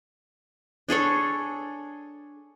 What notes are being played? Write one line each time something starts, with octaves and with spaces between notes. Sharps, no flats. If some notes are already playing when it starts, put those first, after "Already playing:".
D4 G#4 A4 C#5